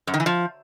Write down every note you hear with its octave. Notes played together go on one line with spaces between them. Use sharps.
F#2
D#3
E3
F3